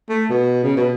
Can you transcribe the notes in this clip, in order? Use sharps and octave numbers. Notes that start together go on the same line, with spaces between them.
A3
B2
C#3
B2